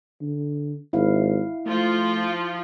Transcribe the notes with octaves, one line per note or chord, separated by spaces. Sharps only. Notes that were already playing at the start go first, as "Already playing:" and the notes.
D3
G#1 E4 F5
F3 A3 F4